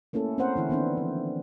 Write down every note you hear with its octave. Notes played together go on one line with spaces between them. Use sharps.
A3 A#3 C#4 E4 A4
C4 C#4 A#4 C5 F#5
D3 E3 E4
D#3 B3 C4 D4
F3